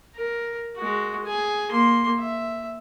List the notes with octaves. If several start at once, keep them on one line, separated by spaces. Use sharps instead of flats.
A#4
G#3 F#4
G#4 G#5
A#3 C6
E5